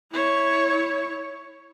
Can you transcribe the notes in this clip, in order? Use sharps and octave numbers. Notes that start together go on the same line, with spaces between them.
E4 C#5